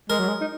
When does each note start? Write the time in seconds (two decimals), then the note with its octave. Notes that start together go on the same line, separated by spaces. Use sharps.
0.09 G#3 A#4
0.19 F#3
0.28 G#3
0.41 D#4